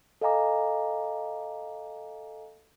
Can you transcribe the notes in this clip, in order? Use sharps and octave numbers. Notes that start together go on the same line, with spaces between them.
A4 D#5 F5 G#5 A#5 D6